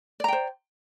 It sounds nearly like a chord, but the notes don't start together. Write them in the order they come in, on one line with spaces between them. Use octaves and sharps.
D5 A#5 G5 C5